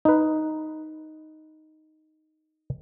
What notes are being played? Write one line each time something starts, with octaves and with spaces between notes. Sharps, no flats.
D#4 B4